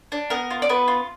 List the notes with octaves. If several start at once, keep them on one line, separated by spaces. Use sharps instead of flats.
D4
B3 A#4
F4
D5
B3 B4
F4